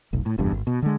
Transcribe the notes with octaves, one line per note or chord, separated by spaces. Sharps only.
F1 B1
A2
F1 E2 G2
G#1
B2
D3 G#3